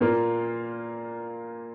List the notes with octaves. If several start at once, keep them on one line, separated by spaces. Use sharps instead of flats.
A#2 A#3 F4